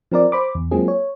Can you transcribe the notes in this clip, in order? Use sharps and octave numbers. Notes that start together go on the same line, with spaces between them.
F3 C4 A#4 D5
C5 B5 D6
E2
F#3 G#3 A#3 C4 F4 G#4
C#5